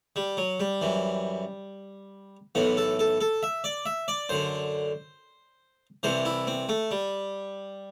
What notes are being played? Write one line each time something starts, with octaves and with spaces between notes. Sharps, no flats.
G3
F#3
G3
F#2 E3
B1 A2 E3 B3
A4
A4
A4
E5
D5
E5
D5
F#2 D3 C5
C2 C3 E3 C5
E4
C4
A3
G3